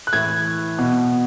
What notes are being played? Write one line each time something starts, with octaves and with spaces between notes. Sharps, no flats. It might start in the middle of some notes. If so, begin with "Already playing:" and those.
F#6
A2 E3 G#6
B2